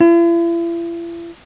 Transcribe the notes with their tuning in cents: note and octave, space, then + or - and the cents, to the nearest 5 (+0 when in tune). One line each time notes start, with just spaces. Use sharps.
E4 +45